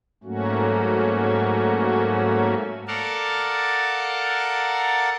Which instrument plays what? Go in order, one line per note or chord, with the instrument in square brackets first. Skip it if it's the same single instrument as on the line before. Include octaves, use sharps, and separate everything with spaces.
[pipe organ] G#2 F#3 A3 A#3 C#4 F#4
A4 A#4 D5 F5 F#5 A5